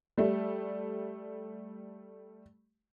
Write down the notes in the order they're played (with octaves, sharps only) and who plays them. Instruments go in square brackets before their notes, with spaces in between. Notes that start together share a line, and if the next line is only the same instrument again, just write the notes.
[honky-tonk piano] G3 A3